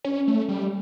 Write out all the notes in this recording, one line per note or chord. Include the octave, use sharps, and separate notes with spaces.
C#4
A3
G3